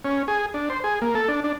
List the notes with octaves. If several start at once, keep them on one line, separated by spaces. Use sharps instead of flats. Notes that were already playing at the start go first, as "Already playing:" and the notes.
C#4
G#4
D4
C5
G#4
A#3
A4
D4
D4